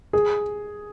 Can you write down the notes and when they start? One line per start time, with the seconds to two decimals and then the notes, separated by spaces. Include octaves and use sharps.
0.13 G#4